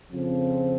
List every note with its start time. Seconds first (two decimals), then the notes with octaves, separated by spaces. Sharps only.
0.11 F2 C#3 F3 C4